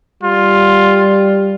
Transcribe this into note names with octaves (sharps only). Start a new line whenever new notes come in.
G3 F4